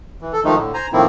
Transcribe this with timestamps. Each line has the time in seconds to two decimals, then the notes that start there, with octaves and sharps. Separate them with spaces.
0.22 E3
0.33 A4
0.44 D#3 F3 G#3 A3 D#4
0.57 A2 D3
0.74 C5 G#5 A#5
0.93 A2 D#3 F3 A#3 C4 E4